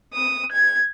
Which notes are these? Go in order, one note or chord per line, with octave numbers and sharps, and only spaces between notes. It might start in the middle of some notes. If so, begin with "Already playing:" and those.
D#6
G#6